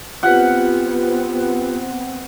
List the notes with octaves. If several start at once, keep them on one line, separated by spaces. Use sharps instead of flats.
B3 C4 F4 G4 B4 F#5